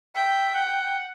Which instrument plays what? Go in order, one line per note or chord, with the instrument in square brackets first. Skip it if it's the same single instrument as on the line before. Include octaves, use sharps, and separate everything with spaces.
[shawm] E5 [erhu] G5
[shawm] F#5